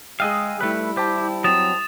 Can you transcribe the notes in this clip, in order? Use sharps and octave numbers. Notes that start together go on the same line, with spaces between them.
G#3 G#4 D#5 F5 G5 E6 F#6
G3 A3 E4 B4
G4 C5 G5 A5
F#3 C4 D#6 A6 E7